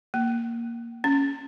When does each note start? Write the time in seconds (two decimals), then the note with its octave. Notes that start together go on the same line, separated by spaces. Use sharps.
0.14 A#3
1.04 C#4